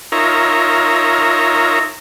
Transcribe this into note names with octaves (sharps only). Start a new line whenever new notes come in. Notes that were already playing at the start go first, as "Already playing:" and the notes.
D#4 F4 A#4 C#5 E5 A#5